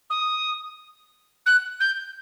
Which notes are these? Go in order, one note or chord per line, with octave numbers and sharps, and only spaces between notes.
D#6
F#6
G6